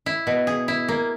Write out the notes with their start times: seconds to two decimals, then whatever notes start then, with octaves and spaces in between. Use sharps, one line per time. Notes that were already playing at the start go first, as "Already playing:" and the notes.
0.06 E4
0.27 B2
0.47 G#4
0.68 E4
0.88 A#3